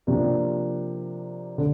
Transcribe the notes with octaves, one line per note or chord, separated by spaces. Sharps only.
C3 F3 A#3 D4
D3